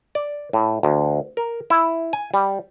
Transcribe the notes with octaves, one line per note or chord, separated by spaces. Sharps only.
D5
A2
D2
A#4
E4
G#5
G3